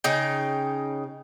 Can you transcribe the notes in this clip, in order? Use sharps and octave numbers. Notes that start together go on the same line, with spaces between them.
C#3 D#4 G5